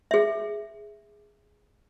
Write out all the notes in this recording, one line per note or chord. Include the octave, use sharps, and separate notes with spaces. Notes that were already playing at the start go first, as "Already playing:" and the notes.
G#4 E5